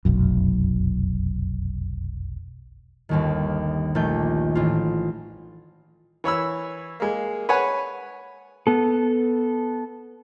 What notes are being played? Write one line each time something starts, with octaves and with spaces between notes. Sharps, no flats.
F1 B1 F#2
G1 D#2 D#3
A#1 D#3 A3 G6
A1 F4
E3 C#5 B5 E6
G#3 A#3
B4 C#5 F#5 G#5
B3 A4